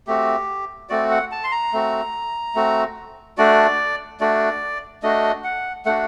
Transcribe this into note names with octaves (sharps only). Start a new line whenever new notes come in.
A3 C4 F#4 G4
A3 C4 F#4 D5
F#5
A5
C6
A#5
A3 C4 F#4
A3 C4 F#4
A3 D4 F#4 D5
A3 D4 F#4 D5
A3 D4 F#4 D#5
F#5
A3 D4 F#4 F#5